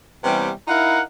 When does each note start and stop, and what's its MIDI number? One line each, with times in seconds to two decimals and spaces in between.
0.24 0.50 48
0.24 0.50 52
0.24 0.50 55
0.24 0.50 59
0.24 0.50 61
0.68 1.00 63
0.68 1.00 64
0.68 1.00 70
0.68 1.00 77
0.68 1.00 78